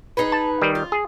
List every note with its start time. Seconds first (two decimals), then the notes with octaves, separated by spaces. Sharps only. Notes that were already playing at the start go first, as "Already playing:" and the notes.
0.17 D#4 G#4 B4
0.32 A5
0.62 D#3 G3
0.75 F4
0.92 G#4